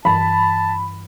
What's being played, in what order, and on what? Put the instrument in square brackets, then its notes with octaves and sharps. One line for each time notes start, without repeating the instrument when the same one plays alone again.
[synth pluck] G2 E3 [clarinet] A5 [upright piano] B5